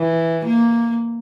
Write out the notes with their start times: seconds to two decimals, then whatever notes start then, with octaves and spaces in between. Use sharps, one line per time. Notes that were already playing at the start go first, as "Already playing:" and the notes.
Already playing: E3
0.46 A#3